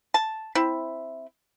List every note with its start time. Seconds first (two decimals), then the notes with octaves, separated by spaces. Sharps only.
0.14 A5
0.55 C4 E4